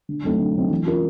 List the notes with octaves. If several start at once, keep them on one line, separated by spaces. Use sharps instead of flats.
D3
F#3 A3 C4 D#4
D3
F#3 A3 C4 D#4
E3
G#3 C#4 F4 A#4